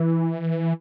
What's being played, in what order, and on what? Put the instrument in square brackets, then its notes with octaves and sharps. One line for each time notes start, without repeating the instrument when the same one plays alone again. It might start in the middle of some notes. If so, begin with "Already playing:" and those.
Already playing: [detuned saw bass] E3